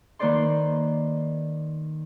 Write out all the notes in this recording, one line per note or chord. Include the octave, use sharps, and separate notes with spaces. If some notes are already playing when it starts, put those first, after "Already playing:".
D#3 A#3 B4 C5 D5 C6